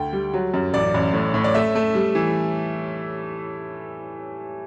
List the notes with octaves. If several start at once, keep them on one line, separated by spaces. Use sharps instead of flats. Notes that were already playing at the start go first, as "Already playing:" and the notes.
Already playing: D2 G5
G3
F#3
F#2
A1 D5
A1
A2
A2
D5
A3 E5
A3
G3
E3